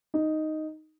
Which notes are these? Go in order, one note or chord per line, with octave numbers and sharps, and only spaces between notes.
D#4